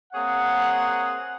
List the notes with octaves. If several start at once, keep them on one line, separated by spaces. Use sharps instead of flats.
A#3 C4 G#4 C#5 F#5